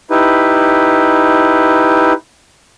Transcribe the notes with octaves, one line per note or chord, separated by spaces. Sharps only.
D#4 E4 G4 B4